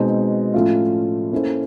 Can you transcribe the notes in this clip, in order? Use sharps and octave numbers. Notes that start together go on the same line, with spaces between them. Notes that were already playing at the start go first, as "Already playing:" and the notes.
Already playing: B2 G#3 C4 D#4
A2 F3 A3 C#4 F4
A#3 C#4 E4 A4 C5